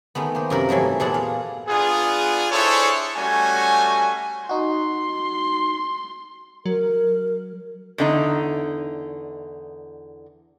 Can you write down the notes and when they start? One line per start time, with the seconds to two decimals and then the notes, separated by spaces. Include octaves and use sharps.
0.15 D#3 G#3 A3 B3
0.35 A#3 C5
0.50 F#2 C3 A#4 B5
0.69 G#2 E3 F#3 G3 A3
1.00 E2 A#2 G#4 A4 D5 F#5
1.14 F5
1.68 B3 D4 F4 G#4
2.52 D4 E4 G#4 A4 C5 C#5
3.17 G3 A3 C#4 F#4 G#5
4.49 D#4 F#4 C6
6.66 F#3 A#4
7.98 E2 D3 D#4